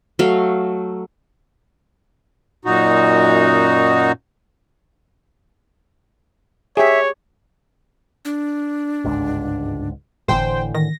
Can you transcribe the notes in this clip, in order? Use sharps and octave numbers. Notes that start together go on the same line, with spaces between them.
F#3 A3 F5
F#2 A#2 D#4 F#4
G4 G#4 C#5 E5
D4
G1 C#2 G#2
G1 A2 D3 E3 C5 G5
D#3 A#6